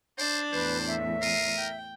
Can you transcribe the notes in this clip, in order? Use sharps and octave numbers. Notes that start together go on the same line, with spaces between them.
D4 C5 D5
E2 A2 B4 C5
E5
A#4 C7 D#7
G5